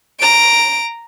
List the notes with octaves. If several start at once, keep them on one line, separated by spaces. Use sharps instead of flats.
A#5 D7